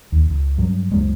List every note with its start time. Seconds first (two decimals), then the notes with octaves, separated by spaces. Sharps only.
0.12 D#2
0.30 C#2
0.58 G2 F#3
0.92 C#2 F#2 G#3